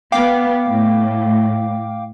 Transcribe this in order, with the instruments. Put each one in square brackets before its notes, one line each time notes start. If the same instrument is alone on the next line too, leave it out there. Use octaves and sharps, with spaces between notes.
[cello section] B3 [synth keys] F5 G5 D6
[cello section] A2